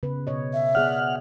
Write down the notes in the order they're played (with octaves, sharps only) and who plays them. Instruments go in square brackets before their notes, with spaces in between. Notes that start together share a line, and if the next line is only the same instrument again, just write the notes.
[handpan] C#3 B3 B4
B2 C#5 D#5
[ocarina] E5
[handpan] B3 G#4 D5 [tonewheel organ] F#5 F6